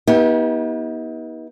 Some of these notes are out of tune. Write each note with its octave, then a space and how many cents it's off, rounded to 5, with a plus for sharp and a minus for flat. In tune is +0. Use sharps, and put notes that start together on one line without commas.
B3 -35 D#4 +40 G4 +0